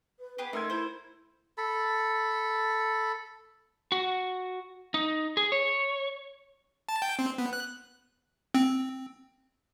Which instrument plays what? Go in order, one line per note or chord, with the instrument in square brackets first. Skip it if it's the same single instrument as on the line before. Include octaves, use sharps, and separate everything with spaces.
[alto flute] B4
[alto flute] B3 [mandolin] G4 G#4 B4
[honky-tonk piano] A3 E6 G#6 [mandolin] D#4 [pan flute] A#4 [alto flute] C6
[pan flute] E4 [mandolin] C5
[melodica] A4 B5
[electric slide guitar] F#4
D#4
G#4
C#5
[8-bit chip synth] A5
G5
C4
B3
F#6
C4